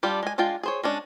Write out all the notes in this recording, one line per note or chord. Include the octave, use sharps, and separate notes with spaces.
G3 D4 F4 G4
G#3 G#5
G#3 D4 F4 G5
G#4 C5 C#5
G#3 C#4 D4